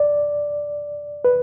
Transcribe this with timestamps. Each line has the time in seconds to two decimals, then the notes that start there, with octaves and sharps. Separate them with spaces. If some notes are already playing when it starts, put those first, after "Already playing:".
Already playing: D5
1.25 B4